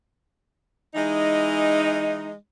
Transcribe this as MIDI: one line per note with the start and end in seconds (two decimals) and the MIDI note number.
0.95 2.30 52
0.95 2.30 56
0.95 2.30 63